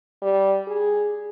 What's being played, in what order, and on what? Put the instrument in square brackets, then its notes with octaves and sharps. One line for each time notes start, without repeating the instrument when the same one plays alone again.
[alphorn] G3
G#4